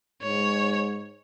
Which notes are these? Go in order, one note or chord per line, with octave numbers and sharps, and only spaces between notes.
G#2 C#5